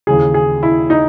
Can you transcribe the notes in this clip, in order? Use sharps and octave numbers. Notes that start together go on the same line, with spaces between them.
D#2 C#3 E3 G#4
G#4
E4
D#4